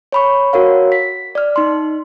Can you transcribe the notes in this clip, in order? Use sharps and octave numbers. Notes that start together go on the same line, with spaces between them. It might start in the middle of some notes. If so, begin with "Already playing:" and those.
C#5 B5 C#6
F#4 A#4 C#5 F5
B6
D5 F6
D#4 C6